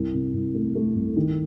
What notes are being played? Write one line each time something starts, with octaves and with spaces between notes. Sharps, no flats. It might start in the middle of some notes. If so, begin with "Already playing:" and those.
Already playing: C2
C3
C2
A3
A3
C2
D#3